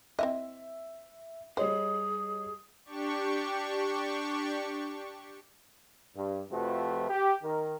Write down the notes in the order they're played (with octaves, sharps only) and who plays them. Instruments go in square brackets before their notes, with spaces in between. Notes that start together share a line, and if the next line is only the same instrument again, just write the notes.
[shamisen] C4 E4 D#5 [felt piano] E5
[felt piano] G3 C#5 D#5 [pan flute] G#4 [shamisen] C5
[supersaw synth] D4 G4 C#6
[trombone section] G2
F2 C3 F3 A3 F#4 B4
G4
D#3 A#4